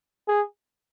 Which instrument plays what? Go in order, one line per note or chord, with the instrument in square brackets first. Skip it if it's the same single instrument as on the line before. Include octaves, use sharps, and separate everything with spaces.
[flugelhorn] G#4